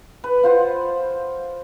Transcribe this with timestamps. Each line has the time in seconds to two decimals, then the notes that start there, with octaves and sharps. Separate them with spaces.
0.24 B4
0.43 F4 C5 F#5